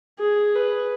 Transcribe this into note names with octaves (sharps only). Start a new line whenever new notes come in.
G#4
B4